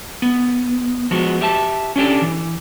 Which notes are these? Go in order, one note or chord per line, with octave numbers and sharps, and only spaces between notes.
B3
F3 G#3 B3 F#4
G4 E5 A5
C#4 D4 G4 A4
E3